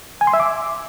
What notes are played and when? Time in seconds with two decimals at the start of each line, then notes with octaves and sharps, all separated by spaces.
0.21 G#5
0.27 C6
0.33 E5
0.40 D6